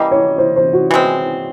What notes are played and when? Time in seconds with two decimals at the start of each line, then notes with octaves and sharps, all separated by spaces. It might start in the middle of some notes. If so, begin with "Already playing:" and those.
Already playing: E3 G3 A#3 D#5
0.11 C#5
0.38 C5
0.56 C5
0.73 F#4
0.91 E3 G#3 C4